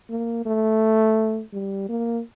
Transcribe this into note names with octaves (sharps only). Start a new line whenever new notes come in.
A#3
A3
G3
A#3